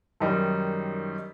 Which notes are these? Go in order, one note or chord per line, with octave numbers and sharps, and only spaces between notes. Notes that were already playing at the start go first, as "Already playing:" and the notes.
F#2 D#3 G3 D#4